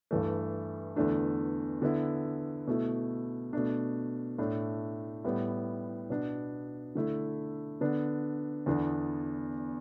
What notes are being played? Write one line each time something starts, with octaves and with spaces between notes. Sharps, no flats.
G2 E3 A3
E2 D3 A3 D4
D3 B3 E4
B2 A3 E4
B2 A3 D4
A2 A3 D4
A2 G3 B3
B2 B3 D4
D3 A3 E4
D3 B3 D4
E2 D3 B3 D4